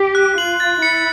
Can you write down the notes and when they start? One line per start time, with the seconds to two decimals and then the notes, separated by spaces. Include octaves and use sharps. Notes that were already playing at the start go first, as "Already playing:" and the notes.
Already playing: G4
0.15 F#6
0.38 F4 F#7
0.60 A6
0.82 E4 C#7